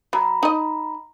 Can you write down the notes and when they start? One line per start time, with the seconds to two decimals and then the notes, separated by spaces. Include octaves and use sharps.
0.13 F#3 A#5 B5
0.43 D#4 D#5